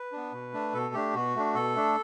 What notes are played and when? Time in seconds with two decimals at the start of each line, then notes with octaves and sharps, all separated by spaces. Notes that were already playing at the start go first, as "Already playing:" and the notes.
Already playing: B4
0.12 B3 D4
0.33 B2
0.53 A3 D4
0.74 B2 A4
0.94 A3 D4 G4
1.15 B2 F#4
1.36 A3 D4
1.55 B2 A4
1.75 A3 D4